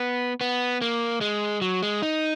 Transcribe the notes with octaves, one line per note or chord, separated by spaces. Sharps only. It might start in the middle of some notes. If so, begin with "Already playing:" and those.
Already playing: B3
B3
A#3
G#3
F#3
G#3
D#4